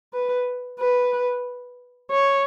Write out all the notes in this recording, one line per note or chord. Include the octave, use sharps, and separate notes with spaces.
B4
B4
C#5